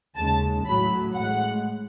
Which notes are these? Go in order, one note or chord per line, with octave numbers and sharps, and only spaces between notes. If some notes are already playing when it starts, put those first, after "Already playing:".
D#2 C#3 G#3 A5
A1 A2 F#3 B5
A1 A2 G#3 F#5